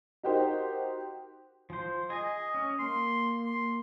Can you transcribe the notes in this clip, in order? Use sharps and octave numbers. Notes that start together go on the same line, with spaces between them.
D#4 F#4 G4 A#4 C5
F3 C5
G#4 D#5 G#5
C#4
A#3 C6
C6